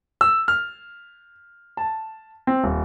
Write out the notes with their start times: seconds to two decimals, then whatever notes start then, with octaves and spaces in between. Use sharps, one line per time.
0.21 E6
0.48 F6
1.77 A5
2.47 C4
2.64 D#1